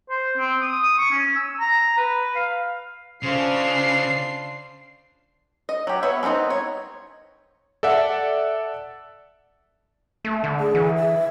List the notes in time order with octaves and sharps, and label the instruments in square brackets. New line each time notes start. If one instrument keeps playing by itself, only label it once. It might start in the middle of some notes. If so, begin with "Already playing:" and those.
[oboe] C5
C4
D#6
C#6
C#4
E6
A#5
B4
F5
[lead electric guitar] C#3 [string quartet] D4 F4 C5 [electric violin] C7
[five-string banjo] D#5
F#3 G4
B3 C#5 E5
A3 B3 C4 D#4 D#5
C#5
[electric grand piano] A4 D5 E5 F#5
[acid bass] A3
D3
[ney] G#4
[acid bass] E3
[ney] E5